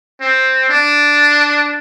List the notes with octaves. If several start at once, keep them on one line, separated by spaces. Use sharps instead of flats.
C4
D4